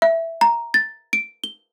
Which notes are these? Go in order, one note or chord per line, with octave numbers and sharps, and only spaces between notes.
E5
A#5
A6
D7
G7